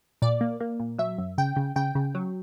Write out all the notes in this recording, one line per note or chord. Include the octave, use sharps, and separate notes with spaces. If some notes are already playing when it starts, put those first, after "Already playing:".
A#2 D5
A#3
A#3
A#2
F#3 E5
F#2
C#3 G5
C#3
C#3 G5
C#3
F#3